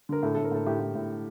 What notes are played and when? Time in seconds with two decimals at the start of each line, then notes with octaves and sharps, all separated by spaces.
0.09 D3 A#4
0.23 A2 A4
0.34 A2 A4
0.44 A#4
0.52 A2 A4
0.66 A2 G4
0.80 A2
0.95 A2